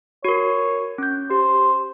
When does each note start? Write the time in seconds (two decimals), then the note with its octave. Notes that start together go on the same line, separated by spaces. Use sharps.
0.25 F#4 A#4 C#5
0.98 C#4 G6
1.31 G4 C5